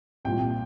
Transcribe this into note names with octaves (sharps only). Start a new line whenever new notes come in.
C2 A#2 F3 G5